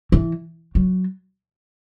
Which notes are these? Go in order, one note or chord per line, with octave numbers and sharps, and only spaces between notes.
E3
F#3